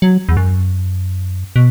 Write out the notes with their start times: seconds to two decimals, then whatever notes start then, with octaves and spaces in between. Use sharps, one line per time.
0.02 F#3
0.29 E2
0.37 F#2
1.56 B2